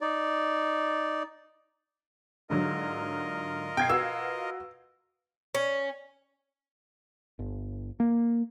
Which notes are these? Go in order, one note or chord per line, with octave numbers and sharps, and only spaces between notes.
D#4 D5
G#2 D3 F#3 F4 A#4 D#5
B2 G5 G#6 C7
F#4 B4 F5 E6
C#4
G1
A#3